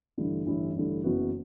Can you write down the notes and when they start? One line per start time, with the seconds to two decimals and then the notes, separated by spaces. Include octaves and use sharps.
0.17 A1 G2 D3 A3 E4
0.46 A1 G2 D3 A3 E4
0.76 A1 G2 D3 A3 E4
1.04 F#1 F#2 E3 B3 F#4